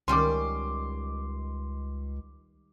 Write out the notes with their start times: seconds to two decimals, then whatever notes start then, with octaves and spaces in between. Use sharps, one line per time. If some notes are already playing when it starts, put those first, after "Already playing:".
0.08 C#2 D#3 G3 C#4 C6 D6